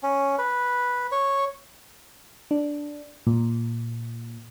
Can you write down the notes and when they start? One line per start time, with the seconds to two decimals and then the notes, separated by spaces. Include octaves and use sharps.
0.03 C#4
0.38 B4
1.12 C#5
2.51 D4
3.27 A#2